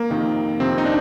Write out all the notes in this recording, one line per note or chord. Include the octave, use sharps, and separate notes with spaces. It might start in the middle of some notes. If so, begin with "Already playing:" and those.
Already playing: A#3
F2 C3 D#3
F2 C3 D#3 C4
D#4
D4